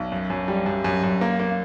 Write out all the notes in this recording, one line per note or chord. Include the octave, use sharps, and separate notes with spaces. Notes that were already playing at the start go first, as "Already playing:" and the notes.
Already playing: B1
F#2
F#2
G3
F#2
F#2
F#2
A#3
A#3